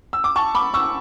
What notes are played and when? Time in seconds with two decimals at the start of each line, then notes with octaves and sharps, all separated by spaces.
0.13 E6
0.24 D6
0.36 A5 C#6
0.55 B5 D6
0.74 C#6 E6